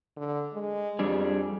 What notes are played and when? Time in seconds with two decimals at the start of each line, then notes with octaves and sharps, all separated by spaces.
0.17 D3
0.54 G#3
0.99 F2 G3 D4 G#4